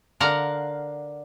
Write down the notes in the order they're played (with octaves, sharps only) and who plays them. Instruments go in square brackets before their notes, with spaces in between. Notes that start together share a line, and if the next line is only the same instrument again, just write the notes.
[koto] D3 A#4 F5 F#5